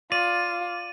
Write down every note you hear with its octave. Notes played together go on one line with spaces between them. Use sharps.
F4 D5 D#7